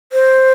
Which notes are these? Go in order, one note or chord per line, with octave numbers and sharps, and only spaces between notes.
C5